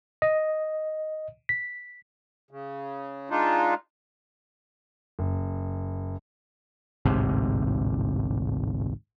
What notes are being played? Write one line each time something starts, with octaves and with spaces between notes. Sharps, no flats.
D#5
B6
C#3
G#3 D4 D#4 F4
F#1
A1 D2 G#2 C3